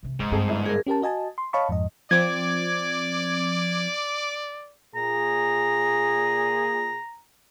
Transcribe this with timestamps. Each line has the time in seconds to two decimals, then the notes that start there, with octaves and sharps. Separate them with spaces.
0.03 C3 E3
0.20 G#2 F3 A3
0.31 G2 C4 G#4 A4
0.48 G1 E4
0.66 G#4 A#4
0.86 C#4 G4 A#4 A5
1.02 F#4 D#5 G#5 A5
1.38 C6
1.53 C#5 D#5 F5 A5 B5 C#6
1.69 F2 G#2 D#5
2.11 F3 C4 D5 D6 G#6
4.95 A#2 G#4 A#5